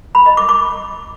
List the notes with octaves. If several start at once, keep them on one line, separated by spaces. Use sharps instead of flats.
B5
D#5
D6
D6